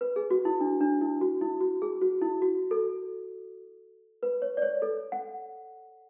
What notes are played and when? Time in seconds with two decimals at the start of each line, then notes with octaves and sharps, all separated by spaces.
0.01 B4
0.16 G#4
0.31 F#4
0.45 E4
0.61 D4
0.81 D4
1.01 E4
1.21 F#4
1.41 E4
1.61 F#4
1.82 G#4
2.02 F#4
2.22 E4
2.42 F#4
2.71 A4
4.23 B4
4.42 C#5
4.57 D5
4.62 C#5
4.82 A4
5.12 F#5